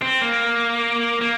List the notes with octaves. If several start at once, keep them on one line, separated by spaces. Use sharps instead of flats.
C4
A#3
A#3